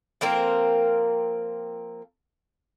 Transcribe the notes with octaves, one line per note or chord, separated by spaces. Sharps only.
F3 A#3 C4 A#4